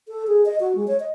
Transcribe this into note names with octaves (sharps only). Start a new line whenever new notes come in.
A4
G#4
D#5
F#4
G#3
C#5
D#5